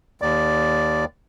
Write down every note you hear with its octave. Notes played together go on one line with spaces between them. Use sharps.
D#2 D5